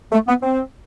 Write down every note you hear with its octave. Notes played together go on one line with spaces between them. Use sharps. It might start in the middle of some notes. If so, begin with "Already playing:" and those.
A3
B3
C4